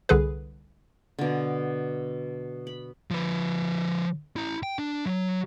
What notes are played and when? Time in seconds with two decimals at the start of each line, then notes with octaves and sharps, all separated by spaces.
0.09 C2 D3 G#4 B4
1.19 B2 D3
2.67 B5
3.11 F3 B4
4.36 E4 A#5
4.63 G5
4.79 D4
5.06 F#3